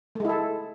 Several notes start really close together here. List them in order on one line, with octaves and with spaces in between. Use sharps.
A3 G#3 E4 A4